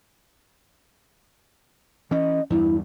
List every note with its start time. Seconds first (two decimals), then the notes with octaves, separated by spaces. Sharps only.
2.11 E3 C#4 D#5
2.50 E2 G2 E4